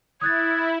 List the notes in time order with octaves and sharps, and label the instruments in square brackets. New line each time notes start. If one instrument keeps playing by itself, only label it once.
[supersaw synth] E4 [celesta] D#6 F#6 A6 [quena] G#6